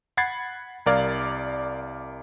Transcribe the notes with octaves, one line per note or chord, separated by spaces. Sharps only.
F#5 B5 G#6 A6 C7
C2 A#4 D5 F5 G#6